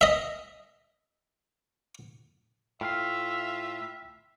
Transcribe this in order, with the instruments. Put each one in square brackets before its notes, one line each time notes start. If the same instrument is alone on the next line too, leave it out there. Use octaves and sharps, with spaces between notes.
[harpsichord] D#5 E5
[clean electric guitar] A2 [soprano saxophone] F4 [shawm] E5 [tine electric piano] G5 F6 C7